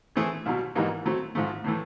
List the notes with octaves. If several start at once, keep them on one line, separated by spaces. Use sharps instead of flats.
E3 A3 C4 E4 G#4
C2 B2 F#3
G#2 E3 G3 A#3 D#4
F#3 A3 C4
G#2 F3 A3
A2 E3 A3